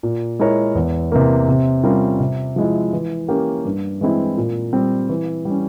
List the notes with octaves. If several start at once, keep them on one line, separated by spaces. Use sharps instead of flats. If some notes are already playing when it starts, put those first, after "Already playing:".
A#2
G#3 E4 A#4 C#5
E2
C3 E3 A#3
C3
G3 C#4 F4 A#4
C3
F3 G#3 E4
E3
A#3 C#4 G4
G2
E3 G#3 C4 E4
A#2
G3 C4
E3
G3 C#4